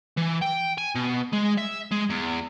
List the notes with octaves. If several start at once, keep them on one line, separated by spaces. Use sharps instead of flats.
E3
G5
G#5
B2
G#3
E5
G#3
E2